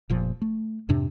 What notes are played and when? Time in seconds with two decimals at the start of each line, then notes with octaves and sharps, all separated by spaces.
0.10 F1 A#2 F3
0.42 A3
0.89 F2 G#2 C3 D4